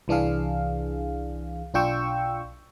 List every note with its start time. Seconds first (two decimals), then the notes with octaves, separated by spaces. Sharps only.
0.08 C2 E3 D4 G#4 F5
1.74 B1 D4 F4 G5 C#6 E6